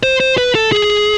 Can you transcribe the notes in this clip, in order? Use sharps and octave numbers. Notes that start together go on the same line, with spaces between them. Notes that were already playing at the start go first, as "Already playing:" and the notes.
C5
C5
B4
A4
G#4